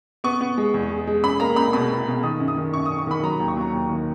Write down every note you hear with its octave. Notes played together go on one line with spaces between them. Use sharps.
B3 C#6
B3
G#3
E2
G#3
G#3
C#4 B5
A#3 A#5
C#2 B5
B2 B5
B2
B2
D#3 D#6
F#2
D#6
D#3
F#2 C#6
F#2 D#6
C#6
D#3 B5
F#3 A#5
D#2
C#6
F#3 A#5
D#2
D#3